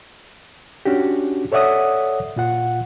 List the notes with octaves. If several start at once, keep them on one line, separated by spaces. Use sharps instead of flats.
C#4 D4 F#4 G4
A4 C#5 D5 E5 F#5 D#6
A#2 F4 F#5